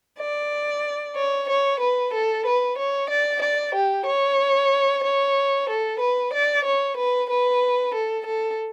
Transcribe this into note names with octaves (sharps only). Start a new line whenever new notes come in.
D5
C#5
C#5
B4
A4
B4
C#5
D5
D5
G4
C#5
C#5
A4
B4
D5
C#5
B4
B4
A4
A4